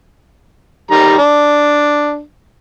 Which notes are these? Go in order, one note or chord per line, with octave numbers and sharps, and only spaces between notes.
D#3 G3 A#5
D4